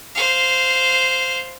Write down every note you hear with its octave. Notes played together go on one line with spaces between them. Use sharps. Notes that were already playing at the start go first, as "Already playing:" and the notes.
C5 F5